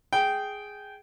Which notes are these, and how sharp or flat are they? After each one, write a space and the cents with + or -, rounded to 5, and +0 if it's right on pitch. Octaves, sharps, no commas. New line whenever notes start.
G#4 +0 G5 -15